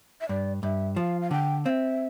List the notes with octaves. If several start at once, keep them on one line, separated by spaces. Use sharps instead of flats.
E5
G2 D5
G2 E5
F3 F5
F5
D3 G5
C4 E5 F5